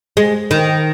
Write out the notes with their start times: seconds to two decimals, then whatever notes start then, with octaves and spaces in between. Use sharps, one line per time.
0.17 G#3
0.51 D#3